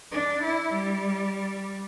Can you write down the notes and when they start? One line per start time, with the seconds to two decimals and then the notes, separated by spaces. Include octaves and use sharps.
0.12 D4
0.43 E4
0.72 G3